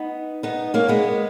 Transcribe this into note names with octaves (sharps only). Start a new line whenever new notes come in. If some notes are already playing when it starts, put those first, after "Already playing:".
Already playing: B3 D#4
B3 D#4
A#3 C#4
G#3 B3